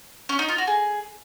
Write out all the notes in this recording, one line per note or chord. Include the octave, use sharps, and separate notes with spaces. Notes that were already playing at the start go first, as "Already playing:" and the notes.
C#4
D#4
F4
F#4
G#4